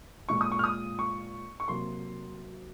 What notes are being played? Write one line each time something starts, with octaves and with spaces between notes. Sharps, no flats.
A#2 G#3 C#6
D#6
C#6
F6
D#6
C#6
C#6
C3 F#3 A#3 C6